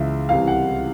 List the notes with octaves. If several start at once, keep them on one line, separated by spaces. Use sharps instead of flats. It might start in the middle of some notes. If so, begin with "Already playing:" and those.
Already playing: C#2 C#3 E3 E5
C2 C3 E3 F5
F#5